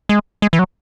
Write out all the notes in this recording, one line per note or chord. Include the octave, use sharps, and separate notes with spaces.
G#3
G#3
E3
F#3